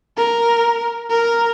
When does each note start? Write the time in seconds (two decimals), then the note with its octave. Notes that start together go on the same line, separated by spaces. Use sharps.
0.17 A#4
1.10 A#4